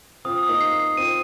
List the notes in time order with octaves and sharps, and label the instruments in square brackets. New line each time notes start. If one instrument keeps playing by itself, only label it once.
[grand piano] C4 F4 [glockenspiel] D#6
[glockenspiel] D#6
[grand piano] A#3 D#4
[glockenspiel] C7
C7
[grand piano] C4 F4 [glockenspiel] D#7